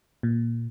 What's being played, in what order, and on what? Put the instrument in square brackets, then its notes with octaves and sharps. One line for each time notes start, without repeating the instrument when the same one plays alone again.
[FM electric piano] A#2